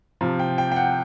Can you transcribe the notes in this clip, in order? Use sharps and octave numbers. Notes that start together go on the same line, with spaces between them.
C3 F3
G5
G5
G5
F#5